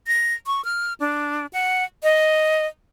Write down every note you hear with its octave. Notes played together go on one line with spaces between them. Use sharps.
A#6
C#6
F6
D4
F#5
D#5